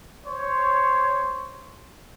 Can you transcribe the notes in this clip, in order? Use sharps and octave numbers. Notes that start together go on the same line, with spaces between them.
C5 C#5